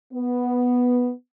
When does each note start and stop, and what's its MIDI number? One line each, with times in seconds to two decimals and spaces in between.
0.13 1.12 59